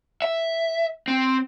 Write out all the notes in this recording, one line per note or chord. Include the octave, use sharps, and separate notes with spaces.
E5
C4